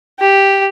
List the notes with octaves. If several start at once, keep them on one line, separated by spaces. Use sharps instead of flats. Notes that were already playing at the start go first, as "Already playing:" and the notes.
G4